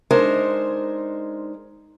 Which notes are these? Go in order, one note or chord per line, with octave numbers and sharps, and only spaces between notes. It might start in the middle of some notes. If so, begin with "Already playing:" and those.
G#3 D4 D#4 A#4 C5